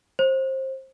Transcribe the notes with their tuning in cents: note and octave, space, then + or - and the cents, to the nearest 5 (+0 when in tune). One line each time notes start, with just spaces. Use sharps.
C5 +20